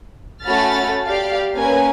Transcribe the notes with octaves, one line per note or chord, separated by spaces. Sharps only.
A3 C#4 F#4 B5 F6 A6
G4 D5 F5
A#3 C#4 A#4 B4 G#5